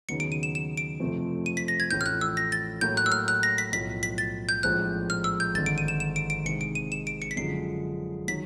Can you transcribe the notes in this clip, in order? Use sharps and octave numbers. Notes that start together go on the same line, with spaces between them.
D#2 C#3 F#3 B3 D#4 C#7
D7
D#7
E7
E7
D7
F2 C3 F3 A3 C4
D#7
B6
A#6
G#6
A1 A2 F3 G6
F6
F#6
E6
A#6
A6
A2 F#3 A#3 G6
F#6
E6
F6
F#6
A#6
B6
B1 A2 F3 B6
B6
A6
G6
A#1 A2 F3 G#3 C4 F#6
F6
E6
G6
G#1 G2 D3 A6
D7
D#7
E7
E7
D7
D7
C3 D#3 G#3 C#7
D7
D#7
E7
D7
C#7
B6
F#2 D3 F3 G#3 C7
D#3 F#3 B6